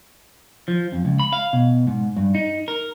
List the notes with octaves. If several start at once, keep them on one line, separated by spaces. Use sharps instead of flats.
F3
F2
C#2
B5
F5
B2
G#2
G2
D#4
A#4